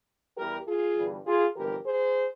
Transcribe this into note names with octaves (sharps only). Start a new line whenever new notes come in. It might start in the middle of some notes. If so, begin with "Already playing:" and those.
E2 E3 G3 G4 A#4
F4 G#4
G1 G2 E3 G3
F4 G#4
G1 F2 E3 G4 A#4
G#4 C5